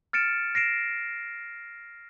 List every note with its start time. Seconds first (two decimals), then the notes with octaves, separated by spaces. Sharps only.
0.13 F6 A6 C#7 D7 E7
0.55 A#6 C7 D7 E7